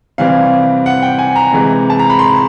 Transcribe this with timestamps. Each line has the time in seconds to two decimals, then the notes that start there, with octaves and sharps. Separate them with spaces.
0.18 C3 E3 G3 C4 F5
0.86 F#5
1.02 G5
1.18 G#5
1.36 A#5
1.53 C3 E3 G#3
1.90 A5
1.99 A#5
2.10 B5
2.19 C6